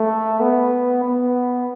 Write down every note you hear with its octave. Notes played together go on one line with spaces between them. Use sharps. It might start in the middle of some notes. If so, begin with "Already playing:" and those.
Already playing: A3
B3
B3